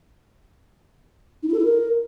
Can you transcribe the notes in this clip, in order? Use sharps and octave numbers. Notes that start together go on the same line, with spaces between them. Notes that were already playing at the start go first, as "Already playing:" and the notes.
D#4
E4
A4
E4
A#4